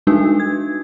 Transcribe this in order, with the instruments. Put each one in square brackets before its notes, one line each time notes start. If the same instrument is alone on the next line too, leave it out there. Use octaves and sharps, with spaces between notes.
[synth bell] G3 G#3 D4 D#4 F#4 B4
G#6